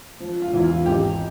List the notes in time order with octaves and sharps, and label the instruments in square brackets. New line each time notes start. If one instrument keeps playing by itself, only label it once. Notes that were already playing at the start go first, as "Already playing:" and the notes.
[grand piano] F3
F4
E2 E4
F4
G#1 G4